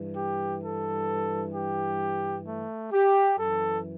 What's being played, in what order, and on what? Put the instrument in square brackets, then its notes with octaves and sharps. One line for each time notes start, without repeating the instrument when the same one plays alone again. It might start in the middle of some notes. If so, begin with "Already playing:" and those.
Already playing: [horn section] G2 E3
G4
A4
G4
A3
G4
F#2 E3 A4